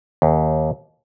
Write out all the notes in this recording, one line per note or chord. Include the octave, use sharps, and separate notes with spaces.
D#2